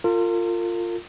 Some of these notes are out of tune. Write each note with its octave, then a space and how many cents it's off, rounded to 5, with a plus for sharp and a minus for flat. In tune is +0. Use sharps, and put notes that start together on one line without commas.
F4 +0 A#4 -45